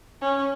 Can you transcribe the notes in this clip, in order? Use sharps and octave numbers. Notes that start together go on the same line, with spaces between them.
C#4